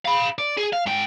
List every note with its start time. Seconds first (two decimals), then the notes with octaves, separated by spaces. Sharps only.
0.05 F5 B5
0.38 D5
0.57 G#4
0.73 F5
0.86 G#2 G5